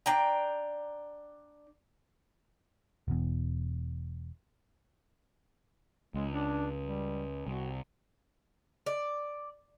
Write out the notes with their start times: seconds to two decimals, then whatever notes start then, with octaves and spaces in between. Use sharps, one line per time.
0.06 D4 G5 A#5
3.08 E1 E2
6.14 C#2 G#3
6.32 D4
6.82 G3
7.47 C2 F#4
8.86 D5